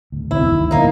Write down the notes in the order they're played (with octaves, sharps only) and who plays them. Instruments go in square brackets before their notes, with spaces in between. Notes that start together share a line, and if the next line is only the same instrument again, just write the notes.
[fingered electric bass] D1 D2
[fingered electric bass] B1 E2 C3 [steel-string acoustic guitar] E4
[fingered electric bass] G1 D2 D#3
[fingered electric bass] A#1 G2 E3 [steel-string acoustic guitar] A#3 D#4